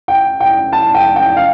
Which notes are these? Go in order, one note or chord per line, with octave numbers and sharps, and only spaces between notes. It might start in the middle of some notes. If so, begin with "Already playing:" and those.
G5
G5
A5
G5
G5
F5